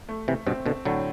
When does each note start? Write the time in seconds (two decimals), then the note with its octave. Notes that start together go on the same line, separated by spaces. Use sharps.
0.09 A3
0.28 C3 E3
0.47 G2 B2 C4
0.66 B2 D3
0.85 A2 D3 F#3